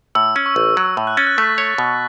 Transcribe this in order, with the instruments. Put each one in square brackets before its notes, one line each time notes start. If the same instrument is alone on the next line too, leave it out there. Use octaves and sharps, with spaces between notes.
[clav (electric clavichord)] A2 [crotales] E6
[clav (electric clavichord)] C#4
[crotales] C#6
[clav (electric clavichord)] A1
[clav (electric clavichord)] F#3 [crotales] E6
[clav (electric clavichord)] A2
[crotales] F#6
[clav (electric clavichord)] C#4 [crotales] A6
[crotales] F#6
[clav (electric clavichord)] A3 [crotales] B6
[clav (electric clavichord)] C#5
B2